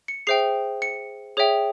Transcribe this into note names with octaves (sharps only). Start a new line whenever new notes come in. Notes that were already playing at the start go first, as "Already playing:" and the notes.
C#7
G#4 C5 E5 G5 C7
C#7
G#4 C#5 E5 G5